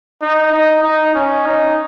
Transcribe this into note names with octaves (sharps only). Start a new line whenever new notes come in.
D#4
D#4
D#4
C#4
D#4